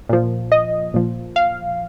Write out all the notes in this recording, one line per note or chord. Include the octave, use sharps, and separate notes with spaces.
A#2 F3
D#5
A#2 F3
F5